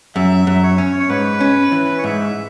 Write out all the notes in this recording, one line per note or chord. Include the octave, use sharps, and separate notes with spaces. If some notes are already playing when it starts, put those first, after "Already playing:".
F#2 E5
F#2
C#5
C#4
C#5
G#2 B4
C#4
E3
C#5
G#2 E5